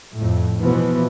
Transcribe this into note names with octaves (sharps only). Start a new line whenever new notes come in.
F2 A2
B2 E3 F3 B3